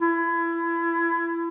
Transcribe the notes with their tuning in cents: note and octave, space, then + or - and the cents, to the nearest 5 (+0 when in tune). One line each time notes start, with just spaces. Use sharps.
E4 +30